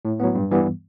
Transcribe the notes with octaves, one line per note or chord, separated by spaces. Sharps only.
A2
F#3 B3
G2
E3 G3 B3